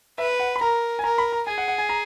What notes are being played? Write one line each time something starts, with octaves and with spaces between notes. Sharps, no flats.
B4 E5
F#5
B5
A#4 A#5
G#5
A#4 A#5
B5
A#5
G#4 G#5
F#5
F#5
G#5
A#5